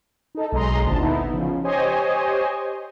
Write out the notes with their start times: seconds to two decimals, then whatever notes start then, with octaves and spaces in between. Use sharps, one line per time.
0.35 D#4 A4
0.52 B1 G#3 D#5 A#5 C6
0.83 G#1 D2 A#2 A5
0.99 B3 D#4 E4
1.33 C#3 F3
1.64 G4 C5 C#5 D#5 G#5